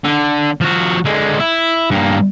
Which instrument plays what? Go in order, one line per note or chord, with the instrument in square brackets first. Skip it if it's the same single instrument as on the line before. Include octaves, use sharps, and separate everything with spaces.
[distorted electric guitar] D3
F3 F#4
D3 G#3
E4
G2 A#3